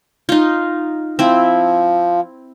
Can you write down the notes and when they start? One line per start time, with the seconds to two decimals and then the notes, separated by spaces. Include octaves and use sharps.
0.29 D#4 F4
1.19 F3 C4 E4